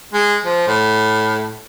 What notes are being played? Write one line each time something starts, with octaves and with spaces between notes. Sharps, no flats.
G#3
F3
A2